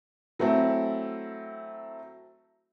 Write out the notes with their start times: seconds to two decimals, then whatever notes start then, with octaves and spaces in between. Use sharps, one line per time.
0.39 F#3 A3 C4 E4